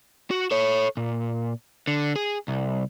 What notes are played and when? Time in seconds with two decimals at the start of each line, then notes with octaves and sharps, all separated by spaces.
0.31 F#4
0.51 A4 C#5
0.97 A#2
1.87 D3
2.16 G#4
2.48 C2